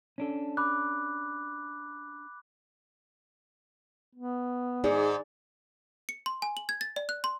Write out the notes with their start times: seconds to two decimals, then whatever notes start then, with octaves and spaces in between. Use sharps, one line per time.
0.18 C#4 D4 A4
0.57 B5 D6 F#6
4.15 B3
4.84 G#2 D#4 G#4 D5
6.09 C#7
6.26 C6
6.42 G#5
6.57 F#7
6.69 G#6
6.81 A6
6.96 D5
7.09 F#6
7.24 C6